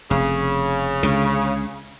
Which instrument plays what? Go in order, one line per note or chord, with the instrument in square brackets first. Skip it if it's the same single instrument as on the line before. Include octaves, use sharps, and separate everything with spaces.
[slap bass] F1 [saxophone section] C#3
[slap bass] C#2 D3